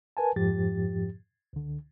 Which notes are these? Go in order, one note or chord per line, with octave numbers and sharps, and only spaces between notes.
A#4 B4 G#5 A5
F2 G#2 F3 G4 A6
C#2 D3